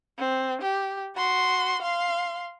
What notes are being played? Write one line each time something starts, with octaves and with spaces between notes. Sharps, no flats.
C4
G4
F#4 C6
F5 C6